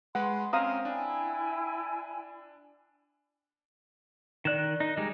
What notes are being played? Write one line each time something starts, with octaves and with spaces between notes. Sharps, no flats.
G#3 B4 F#5 C6
C4 C#4 F5 A#5 D#6
D4 E4 G5 G#5
D#3 D5 F#6 E7
D#4
G3 G#3 D#4